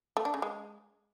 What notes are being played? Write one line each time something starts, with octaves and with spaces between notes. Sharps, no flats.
A3
D4
C#3
G#3